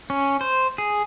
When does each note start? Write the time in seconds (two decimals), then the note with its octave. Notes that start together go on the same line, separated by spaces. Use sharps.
0.10 C#4
0.41 C5
0.78 G#4